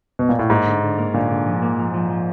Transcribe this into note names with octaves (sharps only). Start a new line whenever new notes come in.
B2
A#2
A2
G#2 A#3
D3
D3
A#3
A#2 D3
D3
F3
A#3
F3
F3
F3